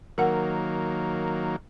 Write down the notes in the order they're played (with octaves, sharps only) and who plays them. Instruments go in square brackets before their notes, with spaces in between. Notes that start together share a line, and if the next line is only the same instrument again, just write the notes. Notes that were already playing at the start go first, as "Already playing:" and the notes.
[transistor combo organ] D#3 F#3 A#3 [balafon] A#4 F#5